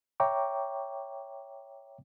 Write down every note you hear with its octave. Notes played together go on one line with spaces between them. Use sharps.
C#5 E5 G5 A#5 C#6 D6